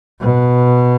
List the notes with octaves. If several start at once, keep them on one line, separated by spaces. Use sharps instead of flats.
B2